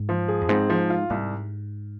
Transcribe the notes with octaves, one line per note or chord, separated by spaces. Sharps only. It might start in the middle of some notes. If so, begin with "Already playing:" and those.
Already playing: G#2
F3
G#4
F2
G#2 C4
F3
F4
C2 G#2